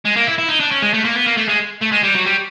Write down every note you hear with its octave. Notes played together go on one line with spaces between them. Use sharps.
G#3
A#3
E4
E4
D#4
D4
C#4
G#3
A3
A#3
B3
A#3
A3
G#3
A3
G#3
G3
F#3
G3